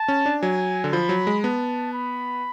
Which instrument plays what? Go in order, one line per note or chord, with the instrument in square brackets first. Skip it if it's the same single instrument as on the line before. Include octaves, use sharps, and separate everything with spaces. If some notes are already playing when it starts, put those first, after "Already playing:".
Already playing: [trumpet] A5
[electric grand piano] C#4
D4
[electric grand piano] F#3 [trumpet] G#5
[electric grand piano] D3
[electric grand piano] F3 [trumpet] B5
[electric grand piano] F#3
G#3
[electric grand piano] B3 [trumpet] A5
[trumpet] B5